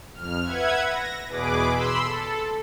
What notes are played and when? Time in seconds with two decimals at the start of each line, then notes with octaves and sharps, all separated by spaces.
0.13 F2 F6
0.43 B4 E5 F#5 G#6
0.86 A#6
1.29 E2 B2 G#4 B4 D6
1.71 B5 C6 E6
2.03 A4